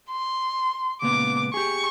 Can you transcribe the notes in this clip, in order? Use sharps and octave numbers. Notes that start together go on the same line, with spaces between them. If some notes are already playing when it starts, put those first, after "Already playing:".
C6
C#2 A#2 B3 D6
G4 G#4 C#6